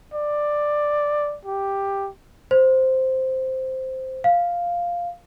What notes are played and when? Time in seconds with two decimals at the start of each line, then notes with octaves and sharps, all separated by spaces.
0.14 D5
1.45 G4
2.51 C5
4.24 F5